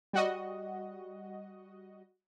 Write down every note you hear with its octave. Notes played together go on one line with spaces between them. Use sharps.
G3 F#4 D#5